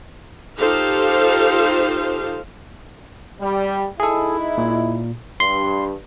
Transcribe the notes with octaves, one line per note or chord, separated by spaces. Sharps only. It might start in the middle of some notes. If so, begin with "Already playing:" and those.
D#4 F4 G4 A4 C5 F5
G3
G#3 D#4 E4 G#4 A4
A#2
G2 C6